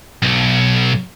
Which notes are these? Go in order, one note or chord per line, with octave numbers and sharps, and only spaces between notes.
B1